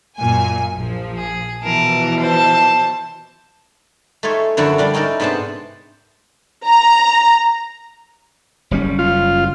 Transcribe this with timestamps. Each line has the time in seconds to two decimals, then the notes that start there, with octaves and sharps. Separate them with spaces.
0.17 F#2 A#2 G#5
0.78 A#1 F3
1.17 G#4
1.62 B2 E3 F3 A#4 A5
2.19 C5 A5
4.23 A3 D#4 F4 G#4 C#5 E5
4.57 F#2 D3 F3 E4 F#4
4.78 G3 D4 F5
4.94 C#4 D#4 E4 A#4 D5
5.20 G#2 C3 B3 D4 C5 A5
6.65 A#5
8.71 F#1 G3 C#4
8.99 F4